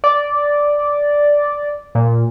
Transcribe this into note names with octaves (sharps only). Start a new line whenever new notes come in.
D5
A#2